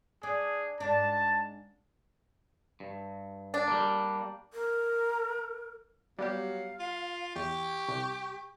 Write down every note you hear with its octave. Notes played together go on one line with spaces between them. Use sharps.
D4 G#4
G#2 D4 A5
G2
D4
G3 A#3
A#4
F#3 G3 B3 G4 F5
F4
E2 G4 C#6
C2